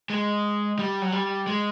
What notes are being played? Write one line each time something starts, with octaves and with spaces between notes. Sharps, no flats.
G#3
G3
F#3
G3
G#3